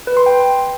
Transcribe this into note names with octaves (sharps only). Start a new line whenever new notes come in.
B4
C6
G5